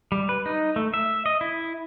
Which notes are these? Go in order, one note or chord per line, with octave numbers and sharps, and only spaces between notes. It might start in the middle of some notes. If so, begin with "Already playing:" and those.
G3
B4
D#4
A3
E5
D#5
E4